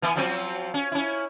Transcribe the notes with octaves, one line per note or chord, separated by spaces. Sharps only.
E3 B3 E4
F3 F#3 C4
C#4
C#4 E4